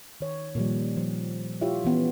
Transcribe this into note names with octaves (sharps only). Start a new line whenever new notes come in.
D#3 C#5
A#2 D#3 F3 G3
F3
E4 F4 G4 C#5 E5
E3 B3 C#4